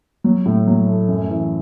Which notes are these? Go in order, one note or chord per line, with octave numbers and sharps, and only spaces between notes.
F#3
A2
F#3
A3
F#2
E3